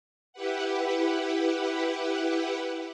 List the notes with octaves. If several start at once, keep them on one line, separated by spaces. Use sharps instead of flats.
E4 G4 B4 F#5